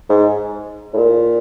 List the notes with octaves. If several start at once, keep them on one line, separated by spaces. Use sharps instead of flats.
G#2
A2
A#2